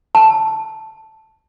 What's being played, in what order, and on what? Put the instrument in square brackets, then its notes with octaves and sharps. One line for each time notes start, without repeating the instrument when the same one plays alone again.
[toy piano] A5